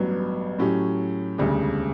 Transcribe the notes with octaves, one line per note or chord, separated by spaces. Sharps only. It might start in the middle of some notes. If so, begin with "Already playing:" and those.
Already playing: A1 G2 F#3 B3
A2 F#3 C#4 G4
E1 D2 C#3 G3